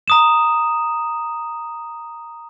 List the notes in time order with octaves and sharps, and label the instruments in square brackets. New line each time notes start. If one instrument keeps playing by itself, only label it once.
[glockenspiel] A#5 D#6 E7